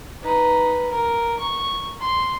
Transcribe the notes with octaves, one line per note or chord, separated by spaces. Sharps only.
D#4 B4
A#4
C#6
C6